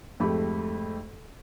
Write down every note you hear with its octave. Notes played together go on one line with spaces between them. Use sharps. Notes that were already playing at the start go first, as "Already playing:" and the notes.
F2 G#2 A3 G4 B5